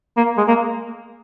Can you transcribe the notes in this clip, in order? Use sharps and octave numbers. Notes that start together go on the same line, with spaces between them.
A#3
G#3
A#3